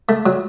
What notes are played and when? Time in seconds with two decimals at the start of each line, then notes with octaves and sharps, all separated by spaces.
0.09 A3
0.26 F#3